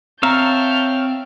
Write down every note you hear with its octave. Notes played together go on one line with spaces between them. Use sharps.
C4 C#5 E5 F5 A5 A#5 F6 G6